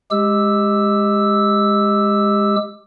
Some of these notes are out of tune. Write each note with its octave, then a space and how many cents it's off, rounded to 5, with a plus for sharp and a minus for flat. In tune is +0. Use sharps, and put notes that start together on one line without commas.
G#3 +0 G4 +10 E6 +0